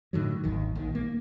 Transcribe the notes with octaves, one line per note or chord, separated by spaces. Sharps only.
A2 D3 D#3 F#3
G#1 D#2 D#3
A#1 D#3
A#3